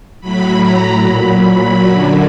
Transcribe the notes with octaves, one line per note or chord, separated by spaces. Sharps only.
A2 F#3 B5
A#5
A#2 F#3 B5
F#2 D3 F#3